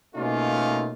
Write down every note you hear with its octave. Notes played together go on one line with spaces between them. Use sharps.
B2 A3 A#3 C#4 D#4 F4